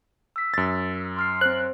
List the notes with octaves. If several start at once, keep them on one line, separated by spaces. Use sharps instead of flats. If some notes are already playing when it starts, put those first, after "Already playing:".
E6 B6
F#2 A6
C6 F6 C7
C4 C5 F#6